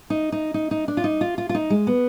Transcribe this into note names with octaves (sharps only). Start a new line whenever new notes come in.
D#4
D#4
D#4
D#4
D4
F4
D#4
F4
F4
F4
D#4
G#3
B3